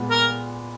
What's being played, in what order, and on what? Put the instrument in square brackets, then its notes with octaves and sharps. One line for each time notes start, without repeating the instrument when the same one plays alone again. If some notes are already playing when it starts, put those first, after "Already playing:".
Already playing: [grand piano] A#2 G#3 B3
[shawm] A#4